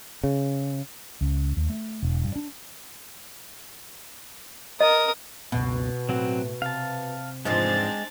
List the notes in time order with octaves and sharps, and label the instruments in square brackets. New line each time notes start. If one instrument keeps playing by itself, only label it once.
[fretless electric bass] C#3
C#2
D#2
A3
E1
G2
D4
[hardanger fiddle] A#4 D#6 [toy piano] D#5
[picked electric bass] C#2 F#2 B3 [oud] B2
[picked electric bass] A2 [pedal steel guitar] F#3 C4 F#4
[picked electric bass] C3 [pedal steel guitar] F5 A5
[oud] E2 G#2 F3 [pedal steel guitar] G#3 [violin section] C4 D4 A6